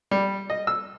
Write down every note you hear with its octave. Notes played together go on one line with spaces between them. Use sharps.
G3
D#5
E6